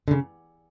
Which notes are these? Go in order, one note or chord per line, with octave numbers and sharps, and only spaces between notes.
D3
C#3